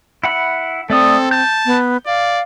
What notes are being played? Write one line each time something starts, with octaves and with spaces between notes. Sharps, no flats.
E4 F#5 B5
A3 C4 A4 D5 D#6
A5 G6
B3
D5 F5